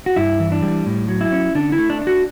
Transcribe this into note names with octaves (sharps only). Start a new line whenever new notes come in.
F#4
G2 E4
E3
D4
G3
A2
F#3
E4
C#4
D3 D4
E4
A3
D4
D4
F#4